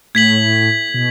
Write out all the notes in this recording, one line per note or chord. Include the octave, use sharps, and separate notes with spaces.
A2 G#6 B6 F#7
B2